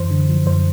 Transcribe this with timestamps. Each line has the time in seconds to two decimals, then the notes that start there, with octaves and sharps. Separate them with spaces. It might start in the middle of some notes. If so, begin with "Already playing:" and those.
Already playing: F#2 E3 C5
0.10 D3
0.29 F3
0.46 F#2 C5